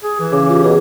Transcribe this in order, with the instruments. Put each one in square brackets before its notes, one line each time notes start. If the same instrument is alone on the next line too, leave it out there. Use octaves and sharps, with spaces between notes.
[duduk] G#4
E3
[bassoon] C#3 [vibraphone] D6
[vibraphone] F4 G4
[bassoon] B2 [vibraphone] G#4